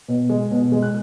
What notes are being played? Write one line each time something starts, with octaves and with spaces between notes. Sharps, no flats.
B2
G#3
B2
G#3
F#6